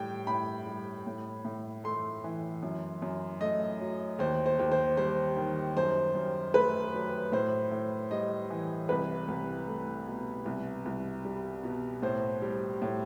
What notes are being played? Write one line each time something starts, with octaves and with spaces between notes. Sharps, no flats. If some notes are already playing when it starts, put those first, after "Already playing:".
Already playing: A2 G3 G5
A2 B5
G3
A2
A2
A3 C6
E3
F#2
F#2
A3 D#5
F#3
D#2 C5
C5
D#2
C5
G3 C5
D#3
F#2 C5
F#2
A3 B4
F#3
A2 C5
A2
G3 D#5
E3
C2 B4
C2
A3
B2
C2
C2
G3
B2
A2 C5
G3
A2